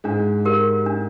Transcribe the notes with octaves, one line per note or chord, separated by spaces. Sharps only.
G#2 G#3 D4
G4 A#4
D4